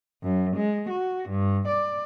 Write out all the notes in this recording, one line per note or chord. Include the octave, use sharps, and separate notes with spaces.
F#2
G#3
F#4
G2
D5